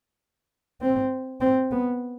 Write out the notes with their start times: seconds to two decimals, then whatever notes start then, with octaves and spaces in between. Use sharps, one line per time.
0.81 C4
1.41 C4
1.71 B3